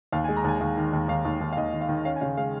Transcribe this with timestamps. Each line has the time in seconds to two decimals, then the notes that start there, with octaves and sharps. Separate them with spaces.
0.12 D#2 F5
0.24 G#5
0.29 G#3
0.37 A#5
0.44 D#2 G#5
0.61 D#2 F5
0.77 D#3
0.93 D#2
1.08 D#2 F5
1.25 D#2
1.41 D#2
1.53 F5
1.57 D#2 D#5
1.73 D#3
1.81 F5
1.89 D#3
2.05 C#4 F5
2.16 G#5
2.21 C#3 F5
2.37 G#3 F5